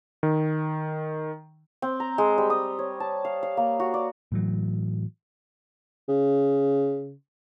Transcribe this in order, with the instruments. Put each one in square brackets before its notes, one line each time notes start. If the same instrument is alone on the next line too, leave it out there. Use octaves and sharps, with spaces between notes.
[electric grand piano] D#3
[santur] C4
A#5
G#3
G3
D#6
C#5
A5
F5
F5
A#3
F#4
D5
[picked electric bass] A2 E3 F#3
[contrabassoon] C#3